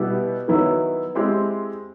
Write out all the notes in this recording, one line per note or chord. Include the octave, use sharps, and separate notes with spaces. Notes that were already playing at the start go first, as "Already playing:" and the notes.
Already playing: B2 G3 B3 E4 G4
D#3 F#3 B3 E4
G#3 C4 E4 G4